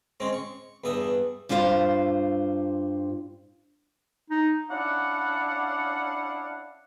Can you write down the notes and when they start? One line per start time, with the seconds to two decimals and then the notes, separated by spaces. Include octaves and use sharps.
0.20 G#3 C4 C#4
0.33 C#6
0.84 E2 G2 E5 D#6
1.49 G2 D4 F4 C5 F5
4.30 D#4
4.71 C#4 D4 E4 D5 F5 F#5